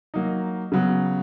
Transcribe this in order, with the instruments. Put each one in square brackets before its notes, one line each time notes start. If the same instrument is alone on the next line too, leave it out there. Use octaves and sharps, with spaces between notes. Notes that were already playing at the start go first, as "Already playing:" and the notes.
[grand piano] F#3 A#3 D#4
C#3 F#3 B3